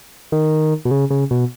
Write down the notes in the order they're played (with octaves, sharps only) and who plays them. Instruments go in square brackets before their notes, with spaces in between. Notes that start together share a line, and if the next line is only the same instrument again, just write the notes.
[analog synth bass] D#3
B2
C#3
C#3
B2